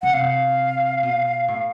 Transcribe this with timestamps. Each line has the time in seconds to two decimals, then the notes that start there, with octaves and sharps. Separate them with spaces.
0.02 C#3 F#5
0.13 C3 F5
1.03 B2
1.48 A2